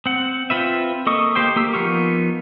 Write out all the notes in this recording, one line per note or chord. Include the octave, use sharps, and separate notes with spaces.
C4 F#5
C4 F4 B4 E5
A#3 A4 D#5 C#6 D#6
A#3 G4 C5 G5
A#3 G4 E6
F3 B3 D#4 A#4 C#6